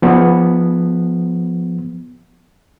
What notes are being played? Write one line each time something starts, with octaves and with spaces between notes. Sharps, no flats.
F3 B3